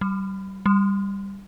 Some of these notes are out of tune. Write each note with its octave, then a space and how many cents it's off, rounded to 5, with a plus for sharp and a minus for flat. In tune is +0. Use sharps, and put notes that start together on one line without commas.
G3 -30
G3 +10